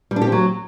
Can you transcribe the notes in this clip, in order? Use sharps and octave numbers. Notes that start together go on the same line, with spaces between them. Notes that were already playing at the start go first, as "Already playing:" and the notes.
G3
D4
G4
C4
F#3